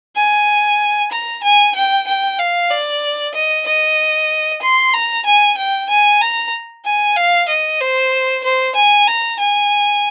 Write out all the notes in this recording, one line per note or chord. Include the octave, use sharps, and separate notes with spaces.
G#5
A#5
G#5
G5
G5
F5
D5
D#5
D#5
C6
A#5
G#5
G5
G#5
A#5
G#5
F5
D#5
C5
C5
G#5
A#5
G#5